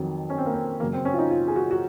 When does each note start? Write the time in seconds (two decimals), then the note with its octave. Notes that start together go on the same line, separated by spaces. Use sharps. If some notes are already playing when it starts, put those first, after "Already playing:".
Already playing: F2 D#3 F#3
0.30 C#4
0.38 C4
0.46 A#3
0.53 C4
0.80 F#2 C#3 F#3 A#3
0.93 C4
1.05 C#4
1.13 F4
1.18 D#4
1.31 F4
1.48 G#4
1.56 F#4
1.71 F#4